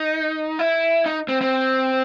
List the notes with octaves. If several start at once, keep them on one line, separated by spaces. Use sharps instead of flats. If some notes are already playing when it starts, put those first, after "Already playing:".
Already playing: D#4
E4
D#4
C4
C4